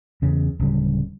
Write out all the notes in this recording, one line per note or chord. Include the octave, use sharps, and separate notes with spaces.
E2 C#3
D1 C#3 G3